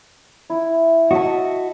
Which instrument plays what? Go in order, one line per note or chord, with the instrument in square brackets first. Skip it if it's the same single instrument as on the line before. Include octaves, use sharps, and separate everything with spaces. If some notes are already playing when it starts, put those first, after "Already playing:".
[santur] E4
[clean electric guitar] F#4 [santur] D#5 E5 A5